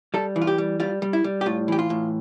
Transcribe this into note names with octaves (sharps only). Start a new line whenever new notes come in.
G3 A4
E3
F4
G4
G3
G3 F4
G3
E4
G3
G4
A2 F4
E3 G4
F4
A2